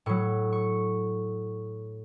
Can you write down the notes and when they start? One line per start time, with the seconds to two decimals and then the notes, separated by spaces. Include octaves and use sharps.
0.06 A2 F#3 C#6
0.53 C#6